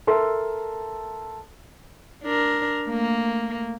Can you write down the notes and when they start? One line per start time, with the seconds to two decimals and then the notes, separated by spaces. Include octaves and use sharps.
0.07 A4 A#4 E5 C6
2.24 D4 A#4
2.88 A3 A#3